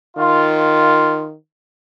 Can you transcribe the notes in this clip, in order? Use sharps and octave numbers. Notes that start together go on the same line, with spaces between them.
D#3 F4